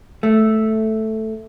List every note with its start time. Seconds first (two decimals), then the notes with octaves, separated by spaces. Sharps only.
0.23 A3